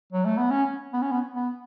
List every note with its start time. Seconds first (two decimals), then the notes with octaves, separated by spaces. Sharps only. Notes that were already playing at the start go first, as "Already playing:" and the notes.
0.13 F#3
0.25 A3
0.37 B3
0.51 C#4
0.93 B3
1.02 C#4
1.11 B3
1.35 B3